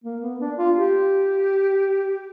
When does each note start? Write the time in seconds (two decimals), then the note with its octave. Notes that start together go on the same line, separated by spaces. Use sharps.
0.04 A#3
0.22 B3
0.40 D4
0.58 F4
0.75 G4